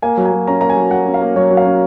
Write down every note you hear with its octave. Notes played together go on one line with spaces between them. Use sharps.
A#3 G#5
F#3
G#5
F#3
C#4 A#5
A#3 A#5
G#5
F#3
F#3 F#5
C#4
F5
A#3
F#3 C#5
F#3
F5
C#4